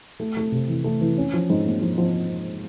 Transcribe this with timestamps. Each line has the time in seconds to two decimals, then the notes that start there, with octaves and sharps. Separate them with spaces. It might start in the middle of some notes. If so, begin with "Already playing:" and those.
0.20 A3
0.37 A3
0.52 C3
0.69 E3
0.84 A3
1.01 E3
1.17 C#4
1.33 F3
1.50 G#2
1.65 A#3
1.81 F3
1.98 F3